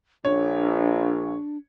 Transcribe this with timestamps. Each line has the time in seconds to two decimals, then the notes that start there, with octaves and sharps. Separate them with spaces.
0.25 A#1 D4 C#5